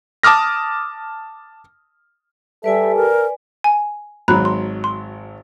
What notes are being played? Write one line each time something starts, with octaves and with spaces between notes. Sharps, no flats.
A5 D6 D#6 F6 A#6
G3 A4 B4 D5 E5 G#5
A#4
G#5
G#1 F#3 A#5 B5 F#6
C6
C6